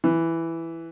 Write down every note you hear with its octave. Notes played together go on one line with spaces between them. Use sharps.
E3